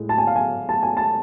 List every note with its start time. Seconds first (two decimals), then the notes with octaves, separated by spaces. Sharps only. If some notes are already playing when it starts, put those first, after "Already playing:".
Already playing: A2 G#3
0.09 A5
0.18 G#5
0.27 F5
0.36 G#5
0.69 A5
0.83 G#5
0.97 A5